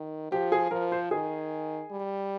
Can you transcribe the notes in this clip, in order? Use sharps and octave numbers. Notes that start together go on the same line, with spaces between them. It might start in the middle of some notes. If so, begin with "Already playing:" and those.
Already playing: D#3
F3 G4
G#4
F3 A#4
C5
D#3 G#4
G3